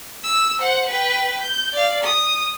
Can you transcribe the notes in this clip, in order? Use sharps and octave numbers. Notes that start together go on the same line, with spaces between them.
E6
C5 F#5
B4 G5
G6
D5 F5
D#6